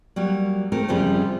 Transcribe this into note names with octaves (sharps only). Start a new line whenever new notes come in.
F#3 G3 A#3
A3 C4 G#4 A#4
F#2 C#3 F3 G3 C4